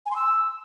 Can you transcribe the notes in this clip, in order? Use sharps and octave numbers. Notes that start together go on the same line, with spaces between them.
G#5
C6
E6